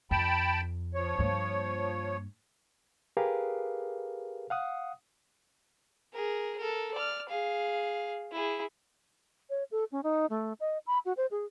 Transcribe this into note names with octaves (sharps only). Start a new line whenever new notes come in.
F2 G5 A5 B5
F3 C#5
G2 A#3
G4 G#4 A#4 B4 F5
F5 F#5 D#6
G#4 A#4
A4 A#4
D5 F6
G#4 F5
E4 G#4
C#5
A4
C#4
D#4
A3
D#5
B5
F#4
C5
G#4